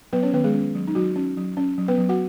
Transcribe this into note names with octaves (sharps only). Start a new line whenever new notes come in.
F#3 B3 B4
C#4 C#5
D#3 B3 B4
G#3 G#4
C#4
F#3
D#4
F#3 F#4
C#4
F#3
C#4
F#3
B3 B4
F#3
F#4 F#5